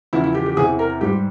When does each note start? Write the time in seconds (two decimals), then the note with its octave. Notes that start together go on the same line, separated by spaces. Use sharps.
0.13 E2 C#3 F3 E4
0.24 E4
0.35 G4
0.46 G4
0.57 E2 C3 E3 G#4
0.79 A#4
1.01 G#2 G3 G4